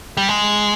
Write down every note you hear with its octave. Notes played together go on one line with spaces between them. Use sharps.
G3
G#3